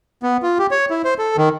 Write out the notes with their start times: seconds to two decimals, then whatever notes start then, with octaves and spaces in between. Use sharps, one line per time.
0.23 B3
0.43 F4
0.59 G4
0.71 C#5
0.90 E4
1.05 C5
1.18 A4
1.37 D#3